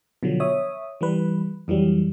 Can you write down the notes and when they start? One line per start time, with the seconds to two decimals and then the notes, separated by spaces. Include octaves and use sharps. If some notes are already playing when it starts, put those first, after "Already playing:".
0.23 B2 D3 F3 F#3
0.40 C#5 E5 D#6
1.01 E3 G3 B4
1.68 F2 E3 F#3 G3